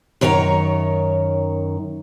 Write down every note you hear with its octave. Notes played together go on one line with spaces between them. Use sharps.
F#2 D#3 C#5 G#5 A#5